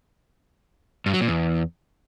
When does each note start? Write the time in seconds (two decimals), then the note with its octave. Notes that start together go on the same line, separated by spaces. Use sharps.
1.06 G2
1.13 F#3
1.21 A#2
1.28 E2